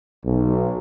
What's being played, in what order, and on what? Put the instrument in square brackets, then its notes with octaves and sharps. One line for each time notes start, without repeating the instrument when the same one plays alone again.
[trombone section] B1